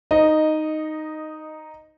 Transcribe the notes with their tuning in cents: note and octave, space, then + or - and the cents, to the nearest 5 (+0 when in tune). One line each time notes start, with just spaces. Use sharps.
D#4 +0 C5 +0 D#5 -10